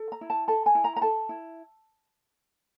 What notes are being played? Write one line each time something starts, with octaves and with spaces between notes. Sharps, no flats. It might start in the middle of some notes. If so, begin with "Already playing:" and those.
Already playing: A4
A#5
E4
A5
A4 A5
G#5
E4
A#5
A#5
A4 A5
E4